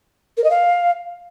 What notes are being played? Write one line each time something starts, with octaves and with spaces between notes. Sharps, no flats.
A#4
D#5
F5